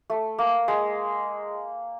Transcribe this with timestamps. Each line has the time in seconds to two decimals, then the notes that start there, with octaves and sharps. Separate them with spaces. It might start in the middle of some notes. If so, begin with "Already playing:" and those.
0.10 A3
0.39 A#3
0.68 G#3